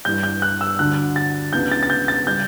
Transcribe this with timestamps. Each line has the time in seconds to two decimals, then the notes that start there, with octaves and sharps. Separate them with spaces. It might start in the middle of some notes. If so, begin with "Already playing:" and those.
0.05 G2 E3 G3 G6
0.23 G6
0.42 F#6
0.61 E6
0.79 D2 D3 G3 D4 F#6
1.16 A6
1.52 C#2 C#3 E3 B3 D4 G6
1.72 A6
1.83 A6
1.90 G6
2.08 A6
2.27 C#3 G3 C#4 G6